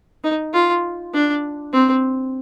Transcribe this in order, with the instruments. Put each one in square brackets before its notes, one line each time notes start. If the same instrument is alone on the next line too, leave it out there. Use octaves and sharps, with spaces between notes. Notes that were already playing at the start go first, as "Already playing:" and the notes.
[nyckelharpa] D#4
F4
D4
C4